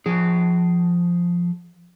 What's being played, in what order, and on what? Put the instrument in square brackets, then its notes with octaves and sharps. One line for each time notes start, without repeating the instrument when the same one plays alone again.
[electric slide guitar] F3 G#4